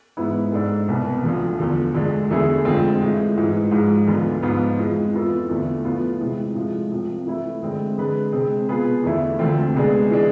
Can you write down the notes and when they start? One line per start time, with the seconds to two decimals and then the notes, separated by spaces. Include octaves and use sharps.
0.17 G#2 E3 G#3 B3 E4
0.52 G#2 G#3 D4 A4
0.88 C2 B2 B3
1.23 D2 D3 F3
1.59 E2 D3 F3
1.94 D2 D3 G#3 D4
2.30 E2 D3 A3 E4 G#4
2.65 F2 D3 G#3 C4 F4
3.01 A2 E3 G#3
3.37 G#2 E3 G#3
3.71 G#2 F3 G#3
4.07 D2 D3 F3 B3 F4
4.42 G#2 F3 B3 F4
4.78 F2 E3 G#3
5.14 F2 E3 B3 F4 A4
5.49 E2 D3 A3
5.84 A2 F3 B3 F4
6.20 C3 E3 G#3
6.55 A2 F3 G#3
6.91 C2 C3 F3
7.26 E3 A3 E4 B4
7.62 D3 G#3 C4
7.97 D3 G#3 D4 G#4 B4
8.32 C3 G#3 C4 G#4
8.69 B2 B3 F4 G#4 B4
9.03 E2 D3 A3 E4
9.39 D2 D3 A3 C4 F4
9.74 C3 G#3 B3 D4 G#4
10.10 E3 G#3 D4 G#4